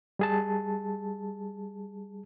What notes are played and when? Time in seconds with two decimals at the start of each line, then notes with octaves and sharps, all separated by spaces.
0.19 G3 G#4 A5